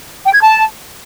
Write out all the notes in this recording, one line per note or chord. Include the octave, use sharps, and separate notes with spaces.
G5
G#6
A5